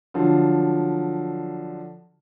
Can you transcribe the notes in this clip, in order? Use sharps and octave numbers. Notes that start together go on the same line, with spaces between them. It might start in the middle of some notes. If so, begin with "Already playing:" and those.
D3 F3 F#3